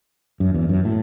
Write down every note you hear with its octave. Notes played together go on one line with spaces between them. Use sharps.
F#2
E2
F#2
A2